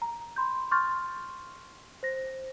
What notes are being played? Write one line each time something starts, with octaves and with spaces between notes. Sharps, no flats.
A#5
B5 C6 G6
C6 C#6 F6 G6 A6
C5 A#6